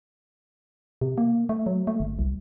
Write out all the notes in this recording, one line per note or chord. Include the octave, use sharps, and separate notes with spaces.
C3
A#3
A3
F#3
A3
G1
C2